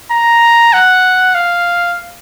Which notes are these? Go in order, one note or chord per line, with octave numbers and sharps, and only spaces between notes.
A#5
F#5
F5